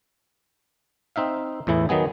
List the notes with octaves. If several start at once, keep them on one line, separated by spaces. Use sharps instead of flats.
C4 D#4 E5 F5
E2 A2 E3 E4
D#3 F#3 B3 G#4